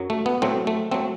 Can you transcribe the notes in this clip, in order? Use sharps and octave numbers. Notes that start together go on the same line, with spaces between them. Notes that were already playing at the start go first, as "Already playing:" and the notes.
Already playing: F#2 F#3
A3
B3
A2 F#3 A3 C4
A3
F#3 A3 C4